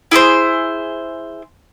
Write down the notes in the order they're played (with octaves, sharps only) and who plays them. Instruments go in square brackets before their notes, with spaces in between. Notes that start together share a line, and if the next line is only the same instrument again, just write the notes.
[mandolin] E4 G#4 A4 C5